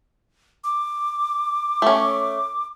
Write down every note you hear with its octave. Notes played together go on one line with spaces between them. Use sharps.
D6
A3 C#4